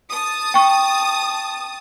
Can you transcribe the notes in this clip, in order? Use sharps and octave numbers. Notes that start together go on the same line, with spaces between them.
A5 D#6
G5 C#6